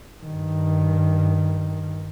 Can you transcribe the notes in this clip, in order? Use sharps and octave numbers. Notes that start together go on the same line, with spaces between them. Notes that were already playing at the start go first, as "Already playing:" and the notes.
G2 D#3